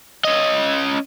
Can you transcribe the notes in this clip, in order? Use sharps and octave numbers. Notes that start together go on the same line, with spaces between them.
C#4 D#5